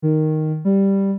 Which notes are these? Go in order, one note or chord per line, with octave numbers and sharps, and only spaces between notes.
D#3
G3